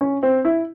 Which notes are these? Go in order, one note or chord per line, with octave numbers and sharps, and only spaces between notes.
C#4
C4
E4